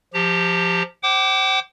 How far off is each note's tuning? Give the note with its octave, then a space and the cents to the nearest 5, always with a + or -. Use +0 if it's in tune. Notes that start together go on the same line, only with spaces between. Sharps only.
F3 +0 G4 +10 A#5 -40
C5 +25 G5 -45 D6 +5